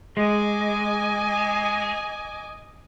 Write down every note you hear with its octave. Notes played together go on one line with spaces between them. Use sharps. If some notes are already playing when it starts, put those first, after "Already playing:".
G#3 D#5 G#5 D6